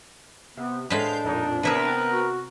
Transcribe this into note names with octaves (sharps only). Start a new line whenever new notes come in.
C3 B3
A2 G#3 D4 B4 C5 F5 G6
F2 A#2 D#4
C3 B3 C4 E4 G#4 A#4 B4
F#4